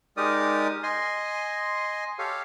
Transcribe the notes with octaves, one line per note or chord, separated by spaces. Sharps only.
G#3 D#4 G4 A#4 D5 D#6
D#5 G#5 C6
G4 A4 C#5 F5